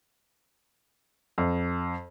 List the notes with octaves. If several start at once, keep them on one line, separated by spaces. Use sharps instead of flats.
F2